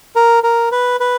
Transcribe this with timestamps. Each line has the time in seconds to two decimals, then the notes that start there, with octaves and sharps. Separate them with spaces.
0.16 A#4
0.43 A#4
0.72 B4
1.00 B4